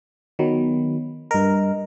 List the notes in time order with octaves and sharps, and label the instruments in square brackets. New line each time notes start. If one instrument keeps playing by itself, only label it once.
[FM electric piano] D#3 F#3 [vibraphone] B3
[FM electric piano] G2 A#4 [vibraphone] D#5